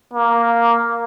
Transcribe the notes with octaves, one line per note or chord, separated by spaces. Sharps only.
A#3